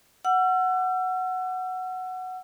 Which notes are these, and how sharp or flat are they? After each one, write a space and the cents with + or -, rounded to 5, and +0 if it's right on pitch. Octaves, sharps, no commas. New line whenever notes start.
F#5 +0 E6 +40